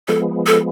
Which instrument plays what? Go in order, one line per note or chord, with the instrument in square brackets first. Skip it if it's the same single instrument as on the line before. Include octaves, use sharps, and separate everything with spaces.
[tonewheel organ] F3 G#3 B3 [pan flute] A4
[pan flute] A4